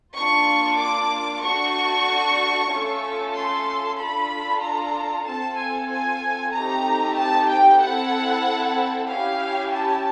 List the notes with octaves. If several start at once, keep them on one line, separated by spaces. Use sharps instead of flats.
A#3 D4 F4 C#6
D6
A3 D4 F#4 C#6
A3 C#4 F4 A4
C6
D4 F4 A4 B5
A#5
C4 F4 A4 A5
G#5
G#5
A3 C4 D#4 G4 A#5
A5
G5
C4 E4 A4 F#5
C#4 E4 G4 F5
A5